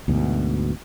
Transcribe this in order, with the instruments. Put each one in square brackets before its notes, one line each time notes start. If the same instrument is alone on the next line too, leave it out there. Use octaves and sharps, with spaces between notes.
[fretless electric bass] D2 G#2 B2